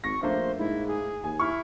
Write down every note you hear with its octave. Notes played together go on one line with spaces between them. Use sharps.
G#1 C#6 A#6
A#1 A3 A#3 D4 C5
G#2 E4
G#4
D#2 G#5
E4 C#6 F6